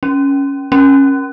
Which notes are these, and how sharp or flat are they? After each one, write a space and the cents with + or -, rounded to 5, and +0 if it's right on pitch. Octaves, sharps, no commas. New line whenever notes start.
C#4 +0
C#4 -15